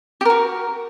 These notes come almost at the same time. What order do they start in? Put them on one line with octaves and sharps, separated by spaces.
G4 A#4 F#4